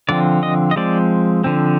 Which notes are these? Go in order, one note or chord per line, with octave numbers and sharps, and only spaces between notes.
D3 F3 C4 D5
D#5
D#5
F3 G#3 C4 D5
D3 F3 C4